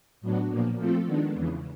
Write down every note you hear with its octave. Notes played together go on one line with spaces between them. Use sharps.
A2 F#3 B3 D4 F#4
A#2 F3 A#3
F3 A3 C4 F4 A4
D#3 G#3 B3 D4
E2 C#3 E3